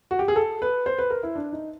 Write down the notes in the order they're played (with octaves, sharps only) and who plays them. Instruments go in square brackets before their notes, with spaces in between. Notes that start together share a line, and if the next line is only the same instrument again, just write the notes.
[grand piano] F#4
G4
G#4
A4
B4
C5
B4
A#4
E4
D4
D#4